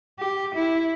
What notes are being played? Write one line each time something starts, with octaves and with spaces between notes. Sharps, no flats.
G4
E4